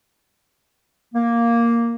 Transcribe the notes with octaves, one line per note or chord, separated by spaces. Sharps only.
A#3